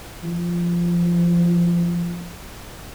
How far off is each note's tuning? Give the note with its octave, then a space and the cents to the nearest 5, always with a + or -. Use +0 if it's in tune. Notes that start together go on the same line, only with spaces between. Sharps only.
F3 -15